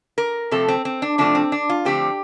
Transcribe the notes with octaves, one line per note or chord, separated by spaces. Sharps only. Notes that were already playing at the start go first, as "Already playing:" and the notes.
A#4
C3 F3 A3 C4 A4
C4
C4
D4
C3 F3 A3 C4 D4
C4
D4
F4
D3 F3 A3 C4 G4